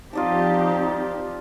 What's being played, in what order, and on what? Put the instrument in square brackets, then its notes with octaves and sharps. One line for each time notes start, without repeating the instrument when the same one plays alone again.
[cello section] F3 C4 G4 [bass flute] D#4 [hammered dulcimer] F4 D5 A5